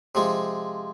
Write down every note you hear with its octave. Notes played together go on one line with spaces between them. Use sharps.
C3 F3 G#3